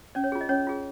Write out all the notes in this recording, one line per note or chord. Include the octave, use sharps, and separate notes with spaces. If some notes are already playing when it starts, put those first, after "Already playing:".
C#4 D5
C#5
F4 G#4
D#5
C#4 C#5
F4 G#4